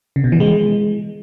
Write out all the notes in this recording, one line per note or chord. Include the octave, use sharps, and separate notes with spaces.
C#3
B2
E3
G#3